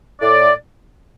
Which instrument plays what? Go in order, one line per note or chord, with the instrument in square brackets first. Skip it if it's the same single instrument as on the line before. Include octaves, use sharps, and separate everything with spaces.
[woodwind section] A2 D5